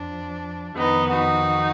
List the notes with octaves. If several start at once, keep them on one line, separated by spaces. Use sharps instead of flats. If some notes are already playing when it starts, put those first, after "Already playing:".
Already playing: F2 F3 D4
F2 D#3 B3 D#4
D#4 F#4